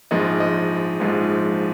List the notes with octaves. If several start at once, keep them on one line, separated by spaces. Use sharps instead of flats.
A#1 G#2 F3 G#3 D#5
D#5
A#1 G#2 F3 G#3